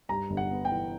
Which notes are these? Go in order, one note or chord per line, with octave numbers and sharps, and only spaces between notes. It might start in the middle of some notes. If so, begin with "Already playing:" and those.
G2 A#5
G1
F#5
B3
G5
E3